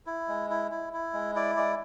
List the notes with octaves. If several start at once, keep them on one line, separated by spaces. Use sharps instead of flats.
E4
G#3
E4
E4
E4
G#3
E4 D5
G#3 D5